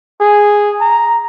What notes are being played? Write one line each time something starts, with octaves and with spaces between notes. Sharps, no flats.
G#4
A#5